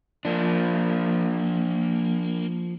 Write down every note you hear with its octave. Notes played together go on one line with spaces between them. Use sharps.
F3 A#3 D4